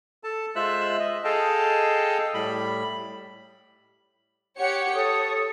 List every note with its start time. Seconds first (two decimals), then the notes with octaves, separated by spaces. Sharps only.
0.24 A4 A5
0.56 G#3 F4 C5 E5 E6 F#6
0.99 D#5
1.24 G#4 A4 D#5 F5 G5 A5
2.34 A2 G3 B5
4.58 G4 C#5 F#5 C#7
4.94 A4 C#5 D#6